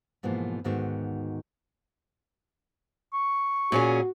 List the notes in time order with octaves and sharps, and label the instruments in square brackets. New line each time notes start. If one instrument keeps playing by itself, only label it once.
[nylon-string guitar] G#2 B2 E3 F3 A#3
D2 G#2 D#3 B3 F#4 E5
[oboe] C#6
[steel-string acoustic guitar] A#2 C#4 G#4 [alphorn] F#4